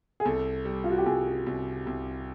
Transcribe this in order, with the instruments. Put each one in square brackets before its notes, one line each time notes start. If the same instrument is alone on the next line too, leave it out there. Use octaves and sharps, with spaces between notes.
[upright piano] G#4
[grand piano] C2 [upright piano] A4
[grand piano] G3
[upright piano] F4
F#4
G4
[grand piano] C2 [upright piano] G#4
[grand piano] C2
C2